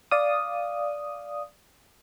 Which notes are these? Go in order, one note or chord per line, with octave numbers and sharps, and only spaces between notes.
D5 F5 D#6